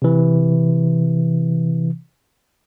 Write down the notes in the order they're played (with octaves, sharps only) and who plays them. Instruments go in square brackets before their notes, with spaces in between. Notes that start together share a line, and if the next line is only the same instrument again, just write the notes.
[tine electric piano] C3 E3